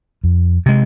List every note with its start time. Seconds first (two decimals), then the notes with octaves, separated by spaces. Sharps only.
0.24 F2
0.66 C3 G#3